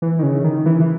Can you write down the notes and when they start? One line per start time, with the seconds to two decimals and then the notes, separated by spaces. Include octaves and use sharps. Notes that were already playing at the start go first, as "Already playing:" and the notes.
0.02 E3
0.19 D#3
0.23 C#3
0.44 D#3
0.66 E3
0.80 E3